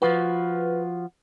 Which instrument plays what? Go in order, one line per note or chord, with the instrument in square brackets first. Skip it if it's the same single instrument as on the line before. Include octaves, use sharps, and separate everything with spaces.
[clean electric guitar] F3 F4 F#4 [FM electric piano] B4